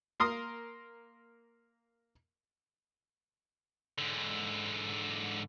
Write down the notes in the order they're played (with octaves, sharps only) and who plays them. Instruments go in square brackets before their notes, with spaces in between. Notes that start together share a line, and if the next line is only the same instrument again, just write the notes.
[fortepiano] A#3 A#4 C6 D#6
[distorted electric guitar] G#2 D3